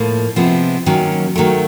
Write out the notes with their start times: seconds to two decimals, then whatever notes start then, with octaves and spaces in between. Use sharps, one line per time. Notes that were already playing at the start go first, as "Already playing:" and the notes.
Already playing: A2 F3 A#3
0.36 C3 F3 G#3 B3 E4
0.86 D#3 F#3 A#3 C#4
1.36 D#3 F#3 A3